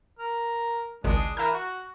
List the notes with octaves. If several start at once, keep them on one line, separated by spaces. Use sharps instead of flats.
A#4
G#1 C#2 G#3 D4
E3 A#4 E5 F6 G6
F#4